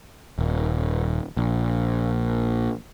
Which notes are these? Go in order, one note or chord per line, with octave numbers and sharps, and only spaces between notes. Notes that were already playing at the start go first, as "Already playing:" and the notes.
D#1
A#1